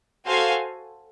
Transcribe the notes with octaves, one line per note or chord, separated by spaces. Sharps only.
F#4 A4 C5 F5 G#5